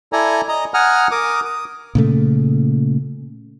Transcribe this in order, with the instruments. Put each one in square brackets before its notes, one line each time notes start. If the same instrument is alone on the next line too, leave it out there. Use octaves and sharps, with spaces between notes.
[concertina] E4 A4 D5 G#5 A#5
D#5 A#5
F#5 G#5 A#5 D#6 F6
A#4 D6 D#6
D#6
[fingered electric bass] A#2 C#3 A3